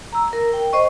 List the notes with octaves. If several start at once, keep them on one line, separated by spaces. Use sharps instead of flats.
A#5 E6
A#4
G5
C5 D#5 C#6